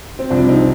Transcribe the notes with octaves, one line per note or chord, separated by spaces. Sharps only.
C4
C2 C3 F3 D4
C4 D#4